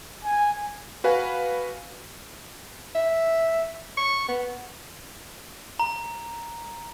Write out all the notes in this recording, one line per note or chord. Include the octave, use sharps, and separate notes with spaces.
G#5
F#4 B4 F5 G#5
E5
C#6
B3
A#5